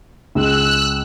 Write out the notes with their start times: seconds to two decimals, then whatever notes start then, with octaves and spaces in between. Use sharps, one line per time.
0.35 C#2 G#3 E6 F#6